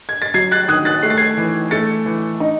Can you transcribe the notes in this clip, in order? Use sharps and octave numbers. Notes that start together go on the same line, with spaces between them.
G#6
A6
F#3 G#6 C7
F#6 A6
D#3 D#6 F#6
F#6 A6
A3 C7
A6
G#6 C7
E3
A3 A6 C#7
E3
D#4